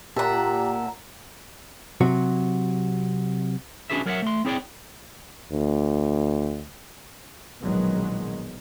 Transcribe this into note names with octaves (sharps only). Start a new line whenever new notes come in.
A#2 G4 E5 F#5 A5 A#5
C3 F#3 F#4
C#4 D4 F#4 G#4 B4 E5
F#3 A#4 C#5 D5 E5 F#5
A3 C6
C4 E4 G#4 C#5 D5 G5
D2
A#1 B2 D#3 F#3 G#3 B3